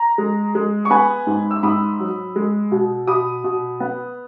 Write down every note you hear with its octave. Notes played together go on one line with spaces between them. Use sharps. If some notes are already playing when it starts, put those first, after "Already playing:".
Already playing: A#5
G#3
G#3
C#6
B3 G#5 B5
G#2
E6
G#2 B5 D#6
F#3
G#3
B2
B2 B5 D#6
B2
B3